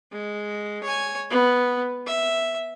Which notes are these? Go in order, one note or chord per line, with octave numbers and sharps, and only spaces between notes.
G#3
C#5 G#5
B3
E5